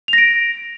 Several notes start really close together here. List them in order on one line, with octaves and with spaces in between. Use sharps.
F7 A#6 D7